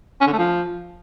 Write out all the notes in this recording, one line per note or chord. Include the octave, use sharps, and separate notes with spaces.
C#4
D3
A3
F3